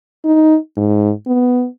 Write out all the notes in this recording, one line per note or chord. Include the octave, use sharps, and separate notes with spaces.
D#4
G#2
B3